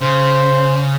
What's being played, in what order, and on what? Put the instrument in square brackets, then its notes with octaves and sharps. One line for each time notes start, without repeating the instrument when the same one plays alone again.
[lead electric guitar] C#3 [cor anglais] C5